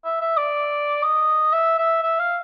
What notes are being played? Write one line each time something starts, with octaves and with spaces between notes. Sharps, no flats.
E5
E5
D5
D#5
E5
E5
E5
F5